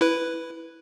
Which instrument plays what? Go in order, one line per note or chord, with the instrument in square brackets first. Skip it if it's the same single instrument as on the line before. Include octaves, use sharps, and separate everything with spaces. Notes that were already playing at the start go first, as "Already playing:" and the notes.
[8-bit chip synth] E4 B4